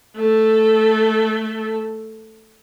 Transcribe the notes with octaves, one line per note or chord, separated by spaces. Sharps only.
A3 A4